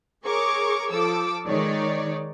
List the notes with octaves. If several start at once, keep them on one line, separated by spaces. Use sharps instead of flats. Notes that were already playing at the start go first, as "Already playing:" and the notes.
G#4 A#4 C#5 C#6 D6
F3 A4 D6 E6
D#3 G#3 D#4 C#5 D5